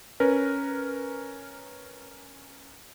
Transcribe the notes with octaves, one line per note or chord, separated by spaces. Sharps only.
C#4 A#4 B4